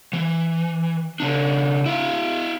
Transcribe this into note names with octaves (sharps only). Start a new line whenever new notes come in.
E3
C#3 D4
E4 F5